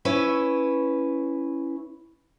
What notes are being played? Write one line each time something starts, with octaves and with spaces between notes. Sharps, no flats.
C#4 E4 B4 C#5